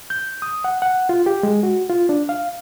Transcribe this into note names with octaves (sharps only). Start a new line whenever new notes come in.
G6
D#6
F#5
F#5
F4
G4
G#3
F#4
F4
D4
F5